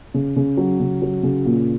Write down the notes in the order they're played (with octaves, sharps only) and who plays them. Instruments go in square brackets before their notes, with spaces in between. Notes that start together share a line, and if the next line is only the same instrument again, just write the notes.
[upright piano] C#3
C#3
F#3
C#3
F#3
C#3
A#2